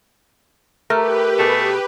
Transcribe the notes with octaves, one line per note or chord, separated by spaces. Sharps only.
A3 G4 A#4 B4
B2 A3 G#4